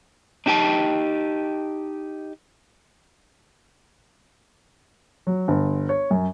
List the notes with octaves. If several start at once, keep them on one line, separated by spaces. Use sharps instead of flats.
D4 D#4 G4 G5 A5
F#3
G1
C#5
F#2